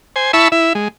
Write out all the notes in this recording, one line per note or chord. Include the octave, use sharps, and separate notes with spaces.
C5 G#5
E4 E5 A5 B5 C#6 E6
E4 E5
G#3